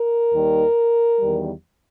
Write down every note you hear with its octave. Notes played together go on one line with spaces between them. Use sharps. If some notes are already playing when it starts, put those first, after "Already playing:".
Already playing: A#4
D#2 D#3 G3
E2 D#3 G3